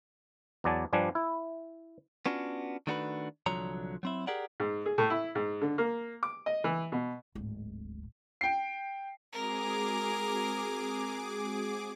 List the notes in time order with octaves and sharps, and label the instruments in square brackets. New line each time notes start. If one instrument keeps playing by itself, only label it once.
[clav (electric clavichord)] E2 F#3 D5 G#5 A5
G2 F3 G3 D4 G#5
E4
[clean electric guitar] B3 C#4 D4 F4 F#4
D#3 A3 D4 F#4 G#4 B4
C2 D3 F3 F#3 C#5 A#5
F#3 C4 E4
G4 G#4 A#4 D5 F#5
[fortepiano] G#2
G#4
A2
E4
G#2
D3
A#3
D6
D#5
E3
B2
[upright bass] D1 G#1
[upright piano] G5 C7
[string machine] G#3 C4 F#4 [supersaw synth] G#4 D6 [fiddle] A#4